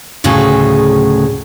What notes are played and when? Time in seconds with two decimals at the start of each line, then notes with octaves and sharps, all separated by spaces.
0.24 D2 A2 C#3 F#3 G#4 A4